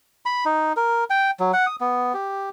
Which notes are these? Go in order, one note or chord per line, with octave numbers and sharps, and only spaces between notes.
B5
D#4
A#4
G5
F#3
F#5
D#6
B3
G4